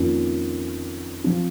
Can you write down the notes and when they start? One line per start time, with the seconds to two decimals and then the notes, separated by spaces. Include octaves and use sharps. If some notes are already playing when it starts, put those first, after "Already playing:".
Already playing: F2 D#3 A#3 C#4 F4
1.24 F3 C4